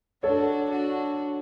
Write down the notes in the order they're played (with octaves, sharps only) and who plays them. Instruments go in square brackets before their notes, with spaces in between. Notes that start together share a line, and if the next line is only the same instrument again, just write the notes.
[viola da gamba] D4 F#4 [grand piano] A4 C#5
[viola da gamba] D4 F#4